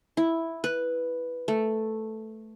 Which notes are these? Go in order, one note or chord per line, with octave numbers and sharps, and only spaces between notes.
E4
B4
A3